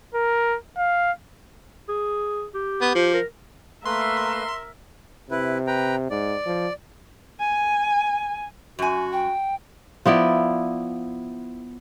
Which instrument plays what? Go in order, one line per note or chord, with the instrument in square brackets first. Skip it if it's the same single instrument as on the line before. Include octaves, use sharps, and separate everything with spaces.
[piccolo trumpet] A#4
F5
[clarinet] G#4
G4
[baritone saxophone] B3
F3
[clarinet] A#4
[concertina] A3 A#3 B4 [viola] A#4 E5 [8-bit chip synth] C6
[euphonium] C3 [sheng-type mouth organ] E4 B4
[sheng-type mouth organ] B4 G5 A#5
[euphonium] G#2 [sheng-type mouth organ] D5
[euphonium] F3
[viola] G#5
[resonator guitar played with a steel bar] F#2 G#5 [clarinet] F#4
[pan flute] G5
[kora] F3 B3 E4 D5